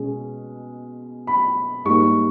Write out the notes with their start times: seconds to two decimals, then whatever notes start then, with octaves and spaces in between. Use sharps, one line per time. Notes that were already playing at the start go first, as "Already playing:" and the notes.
Already playing: B2 G#3 C#4
1.27 B5
1.85 G#2 G3 A#3 C#6